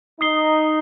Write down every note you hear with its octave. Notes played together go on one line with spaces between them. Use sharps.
D#4 D#6 C7 G7